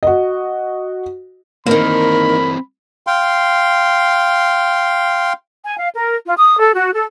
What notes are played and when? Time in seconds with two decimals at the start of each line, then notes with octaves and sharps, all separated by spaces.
0.03 F#4 D#5
1.66 D#3 E3 A#3 C4 A#4 B5
3.07 F5 G5 C6
5.65 G#5
5.78 F5
5.94 A#4
6.26 F4
6.37 D#6
6.58 A4
6.74 F#4
6.94 A4